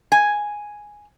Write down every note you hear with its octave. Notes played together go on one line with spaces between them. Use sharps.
G#5